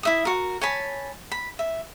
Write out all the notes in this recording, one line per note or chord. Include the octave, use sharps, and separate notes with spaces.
E4 E5 D#6
F#4 A#4
C#5 G#5 A5 B5
B5
E5